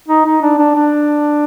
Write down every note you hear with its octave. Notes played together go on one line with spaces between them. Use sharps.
D#4
D#4
D4
D4
D4